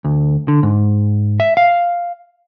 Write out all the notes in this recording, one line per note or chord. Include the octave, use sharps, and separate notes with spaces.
D2
D3
G#2
E5
F5